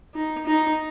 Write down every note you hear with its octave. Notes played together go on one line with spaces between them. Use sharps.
D#4
D#4